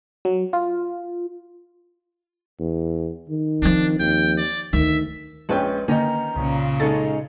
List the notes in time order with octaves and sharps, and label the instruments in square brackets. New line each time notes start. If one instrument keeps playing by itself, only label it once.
[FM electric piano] F#3
F4
[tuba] E2
D#3
[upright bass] F3 C4 [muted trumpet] D4
[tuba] D#2 [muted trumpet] G5
[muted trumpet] D5
[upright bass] D2 [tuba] D#3 [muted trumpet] E5
[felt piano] A#1 C#4 G5 [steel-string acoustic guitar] G#3 B4
[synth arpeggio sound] D3 A#3 [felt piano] D#3 D#4 [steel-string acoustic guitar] C#4 A#5
[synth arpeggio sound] C2 [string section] A#2 C#3
[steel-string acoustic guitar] G#3 C#4 D#4 [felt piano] A4 [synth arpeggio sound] A6